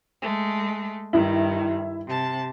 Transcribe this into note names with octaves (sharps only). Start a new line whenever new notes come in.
G#3 A3
G2 D#3 E4
C3 A5